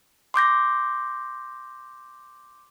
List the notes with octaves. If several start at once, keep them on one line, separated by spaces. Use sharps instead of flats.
C6 D6 G6 A#6